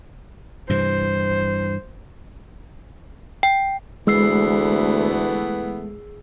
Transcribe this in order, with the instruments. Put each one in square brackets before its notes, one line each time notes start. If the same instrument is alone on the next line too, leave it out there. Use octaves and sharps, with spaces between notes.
[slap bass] G2 C3 E3 [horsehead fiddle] C5
[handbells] G5
[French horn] D2 [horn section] E3 A3 B3 [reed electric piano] G#3 [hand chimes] G#4 E6 C7